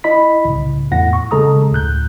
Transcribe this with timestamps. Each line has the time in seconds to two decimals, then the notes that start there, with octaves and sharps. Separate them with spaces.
0.04 E4 D#5 B5 B6
0.45 C2 A2 C#3
0.91 E2 A2 F#5 A#6
1.13 C#6
1.31 C#3 G#3 A4 A#5 D#6
1.72 D2 A2 F#6 G6